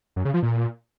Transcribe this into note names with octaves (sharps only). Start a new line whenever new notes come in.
F#2
C#3
F3
A#2